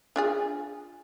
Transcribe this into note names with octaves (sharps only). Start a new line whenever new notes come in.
D4 F4 G#4